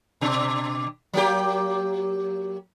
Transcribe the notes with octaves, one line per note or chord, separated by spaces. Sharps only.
B2 D4
F#3 A#3 G4